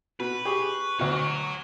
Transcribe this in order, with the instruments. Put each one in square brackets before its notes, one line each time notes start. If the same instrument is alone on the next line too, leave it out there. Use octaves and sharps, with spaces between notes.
[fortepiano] B2 [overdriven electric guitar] B4
[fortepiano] G4 G#4 [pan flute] C#6
[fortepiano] D2 B2 [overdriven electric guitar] F#4 C#5